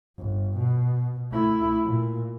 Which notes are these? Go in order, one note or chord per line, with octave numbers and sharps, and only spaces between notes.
G1
B2
A3 E4
A#2